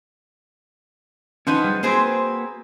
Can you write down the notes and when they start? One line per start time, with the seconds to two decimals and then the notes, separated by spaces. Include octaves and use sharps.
1.47 F3 B3 C#4 D#4
1.64 G3 G#3
1.83 A#3 C4 F#4 G#4 B4 C5